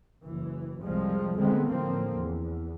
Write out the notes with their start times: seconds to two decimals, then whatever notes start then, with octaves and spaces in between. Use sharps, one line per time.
0.24 F#1 E3
0.84 C2 F2 C3 F3 G3 G#3
1.38 D3 D#3 G#3 A3 B3 C4
1.69 A1 D3 F3 A#3 C4
2.15 E2